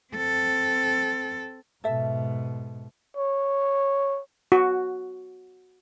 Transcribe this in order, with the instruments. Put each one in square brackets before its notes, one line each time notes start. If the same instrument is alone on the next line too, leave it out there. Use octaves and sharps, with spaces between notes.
[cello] C4 A4
[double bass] G#2 B2 [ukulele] A4 E5
[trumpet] C#5
[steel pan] F#4